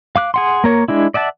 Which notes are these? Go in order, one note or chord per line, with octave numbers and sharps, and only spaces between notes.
F5 D6 F#6
G#4 F#5 C6
A#3 A#4 C#5
G#3 D4 E4
D5 E5 F#5 A5